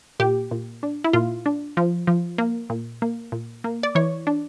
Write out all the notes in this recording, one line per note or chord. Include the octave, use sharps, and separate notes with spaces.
A#2 G4
A#2
D4
E4
A#2 F4
D4
F3
F3
A#3
A#2
A#3
A#2
A#3
D5
E3 C#5
D4